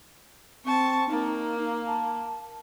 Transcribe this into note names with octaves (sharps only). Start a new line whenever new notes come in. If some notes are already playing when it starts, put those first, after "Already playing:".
C4 A5 C#6
A#3 D#4
A5